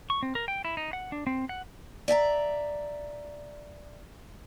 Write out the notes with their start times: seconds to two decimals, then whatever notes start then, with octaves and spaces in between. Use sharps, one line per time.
0.10 C#6
0.23 C4
0.35 A#4
0.48 G5
0.65 E4
0.77 D#4
0.93 F#5
1.12 D4
1.27 C4
1.49 F#5
2.08 D5 E5 G#5 A#5